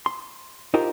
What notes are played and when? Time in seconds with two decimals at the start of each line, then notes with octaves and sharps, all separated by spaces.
0.06 C6
0.74 D#4 F4 G4 A#4 C5